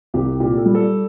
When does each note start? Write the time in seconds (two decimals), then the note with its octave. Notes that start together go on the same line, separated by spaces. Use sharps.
0.14 C2 G4
0.40 A#2 G4
0.57 A4
0.66 G3
0.75 A4